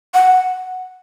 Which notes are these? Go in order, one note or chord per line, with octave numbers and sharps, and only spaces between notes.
F#5